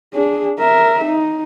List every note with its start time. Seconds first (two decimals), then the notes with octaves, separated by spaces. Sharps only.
0.14 D4 G#4
0.59 A#4 E5
1.05 D#4